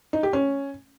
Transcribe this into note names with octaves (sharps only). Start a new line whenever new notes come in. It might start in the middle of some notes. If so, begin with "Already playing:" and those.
D#4
G4
C#4